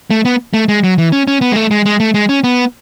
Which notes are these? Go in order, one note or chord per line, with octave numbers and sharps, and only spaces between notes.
A3
B3
A3
G#3
F#3
E3
C#4
C#4
B3
G#3
A3
G#3
G#3
A3
G#3
C#4
B3